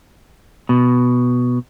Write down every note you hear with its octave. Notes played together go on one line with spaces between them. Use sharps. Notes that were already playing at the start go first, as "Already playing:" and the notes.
B2